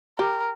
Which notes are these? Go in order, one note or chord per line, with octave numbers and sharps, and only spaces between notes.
G4 A#4